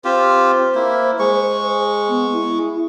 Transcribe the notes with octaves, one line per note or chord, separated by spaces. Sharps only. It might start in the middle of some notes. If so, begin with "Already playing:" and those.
C4 F4 G4 C5
A#3 E4
G#3 C#6
B3
E4